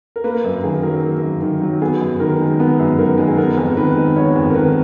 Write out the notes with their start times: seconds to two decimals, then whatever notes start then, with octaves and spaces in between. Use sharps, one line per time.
0.16 A#4
0.24 A#3 B4
0.44 F#2
0.63 D#3 G#4
0.83 F#3 A#4
1.03 A#3
1.22 F#2
1.42 D#3
1.62 F#3
1.81 B3 G#4
2.01 F#2
2.20 D#3 A#4
2.40 G#3
2.60 B3 A#4
2.79 F#2
2.99 D#3 A#4
3.18 G#3
3.27 G#4
3.37 B3 A#4
3.57 F2
3.77 D#3 B4
3.96 G#3
4.16 B3 C#5
4.36 F2
4.50 A#4
4.55 D#3 B4